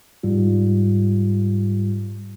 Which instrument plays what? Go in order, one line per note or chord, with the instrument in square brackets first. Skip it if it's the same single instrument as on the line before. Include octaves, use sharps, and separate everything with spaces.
[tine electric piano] G#2 G3 F4